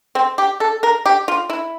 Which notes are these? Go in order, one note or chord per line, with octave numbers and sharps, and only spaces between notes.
C4
G4
A4
A#4
G4
F4
E4